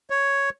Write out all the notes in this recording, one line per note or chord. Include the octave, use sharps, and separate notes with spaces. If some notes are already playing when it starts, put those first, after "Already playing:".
C#5